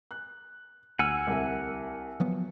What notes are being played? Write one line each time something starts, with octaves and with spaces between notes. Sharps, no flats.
F#6
D2 F#5 G#5 E6 F6
C2 A#4 E5
F3 F#3 B3